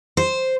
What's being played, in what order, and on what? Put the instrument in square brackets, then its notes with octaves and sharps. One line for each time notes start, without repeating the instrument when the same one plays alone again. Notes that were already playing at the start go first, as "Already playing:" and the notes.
[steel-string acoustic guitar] C5